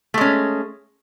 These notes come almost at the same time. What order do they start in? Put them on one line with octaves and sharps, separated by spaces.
A3 G#3 C#4